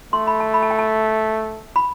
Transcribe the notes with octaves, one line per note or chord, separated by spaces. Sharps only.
A3 C6
B5
A5
B5
A5
G5
A5
B5